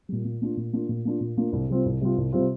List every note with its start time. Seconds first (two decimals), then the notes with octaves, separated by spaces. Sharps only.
0.09 A#2 G3
0.25 A#2
0.41 A#3 D4 F4
0.57 A#2
0.73 A#3 D4 F4
0.89 A#2
1.05 A#3 D4 F4
1.20 A#2
1.37 A#3 D4 F4
1.52 C2
1.70 C3 G3 C4 F4
1.86 C2
2.01 C3 G3 C4 F4
2.17 C2
2.32 C3 G3 C4 F4